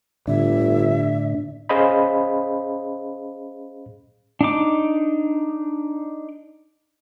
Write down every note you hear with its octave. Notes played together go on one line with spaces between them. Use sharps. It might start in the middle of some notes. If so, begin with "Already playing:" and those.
G1 A2 D3 D4 E5
C#4 G#4 C5 D#5 F5 B5
D4 D#4 D6